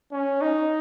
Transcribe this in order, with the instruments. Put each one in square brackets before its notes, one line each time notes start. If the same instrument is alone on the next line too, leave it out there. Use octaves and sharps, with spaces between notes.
[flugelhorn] C#4
D#4